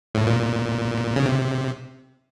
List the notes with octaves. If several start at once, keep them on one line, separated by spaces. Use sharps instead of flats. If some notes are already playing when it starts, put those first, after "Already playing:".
A2
A#2
C#3
C3